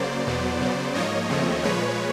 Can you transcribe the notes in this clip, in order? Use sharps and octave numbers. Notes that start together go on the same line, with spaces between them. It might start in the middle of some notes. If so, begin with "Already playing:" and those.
Already playing: C#3 F#3 A#3 C5 D5
E2 B2 F#3 B3
C#3 F#3 B3
G#2 F3 A#3 C#5 D#5
D#2 C#3 F3 A3 C4
A#2 F3 G#3 B4 C#5